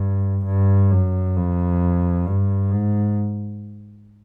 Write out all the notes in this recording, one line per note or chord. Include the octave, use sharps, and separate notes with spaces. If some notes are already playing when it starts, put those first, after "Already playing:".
Already playing: G2
G2
F#2
F2
G2
G#2